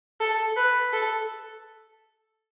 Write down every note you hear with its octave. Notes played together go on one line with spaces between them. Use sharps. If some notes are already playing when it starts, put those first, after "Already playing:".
A4
B4
A4